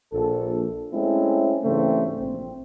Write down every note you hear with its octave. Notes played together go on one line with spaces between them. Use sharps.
A#1 A4
G#3 A3 C4 C#4 E4
G#2 C#3 E3 G3 A3 C4
A#1 C4